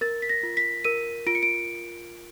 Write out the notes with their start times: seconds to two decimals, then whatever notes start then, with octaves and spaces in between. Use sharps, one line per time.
0.01 A#4 A6
0.22 B6
0.29 A#6
0.43 F4
0.57 B6
0.84 A#4 D#7
1.26 F4 D7
1.35 C#7
1.43 D7